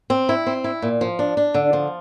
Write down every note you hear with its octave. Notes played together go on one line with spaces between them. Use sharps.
C4
E4
C4
E4
A#2
F3
D4
D4
D3
F3